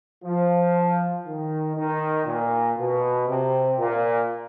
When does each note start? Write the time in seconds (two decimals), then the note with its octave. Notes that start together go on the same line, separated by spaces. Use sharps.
0.24 F3
1.25 D#3
1.76 D#3
2.26 A#2
2.77 B2
3.27 C3
3.78 A#2